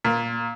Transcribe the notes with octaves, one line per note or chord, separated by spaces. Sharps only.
A#2